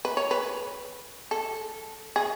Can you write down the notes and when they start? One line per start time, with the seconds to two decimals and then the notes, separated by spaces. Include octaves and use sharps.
0.05 B4
0.17 C#5
0.31 B4
1.31 A4
2.16 G#4